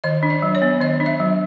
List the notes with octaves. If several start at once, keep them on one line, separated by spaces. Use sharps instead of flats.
D#3 D#5
D4
D5
F#3
C#5
B3
D#3 D#5
D4
E5
F#3